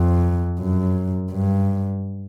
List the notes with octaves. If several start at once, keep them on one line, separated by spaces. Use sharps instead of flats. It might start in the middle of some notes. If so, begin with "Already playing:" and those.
Already playing: F2
F#2
G2